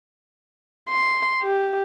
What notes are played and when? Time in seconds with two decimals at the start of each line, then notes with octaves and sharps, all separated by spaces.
0.89 C6
1.43 G4